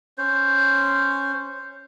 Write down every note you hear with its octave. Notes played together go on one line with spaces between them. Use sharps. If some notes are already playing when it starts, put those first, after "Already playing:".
C#4 C5